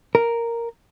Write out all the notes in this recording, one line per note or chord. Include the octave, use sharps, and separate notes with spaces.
A#4